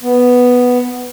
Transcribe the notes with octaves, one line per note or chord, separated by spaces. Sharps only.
B3